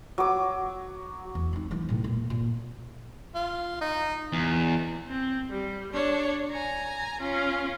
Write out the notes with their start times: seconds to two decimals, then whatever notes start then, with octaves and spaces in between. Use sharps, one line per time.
0.18 F#3 D6
1.35 E2
1.53 C4 D#4
1.71 E3 F#3
1.89 A2 C3
2.04 A#2 A#3
2.30 A#2
3.35 F4
3.81 D#4
4.33 E2
5.08 C4
5.50 G3
5.92 D4 C#5
6.51 G#5 A#5
7.21 C#4 F4